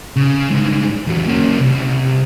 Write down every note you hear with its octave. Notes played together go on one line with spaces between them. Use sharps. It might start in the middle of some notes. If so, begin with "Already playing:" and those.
C#3
G2 G#3
E2 F#3
A#3 C#4
C2